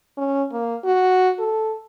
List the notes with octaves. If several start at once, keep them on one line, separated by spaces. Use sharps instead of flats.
C#4
A#3
F#4
A4